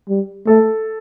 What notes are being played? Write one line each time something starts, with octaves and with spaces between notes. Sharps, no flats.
G3
A3 A4